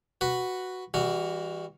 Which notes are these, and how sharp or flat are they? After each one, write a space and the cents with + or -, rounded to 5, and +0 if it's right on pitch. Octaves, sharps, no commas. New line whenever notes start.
F#4 +0 B4 +0
E3 -5 G3 +35 F#4 +0